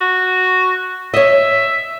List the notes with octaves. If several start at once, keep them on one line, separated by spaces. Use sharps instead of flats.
F#4
C#5 D#5 E5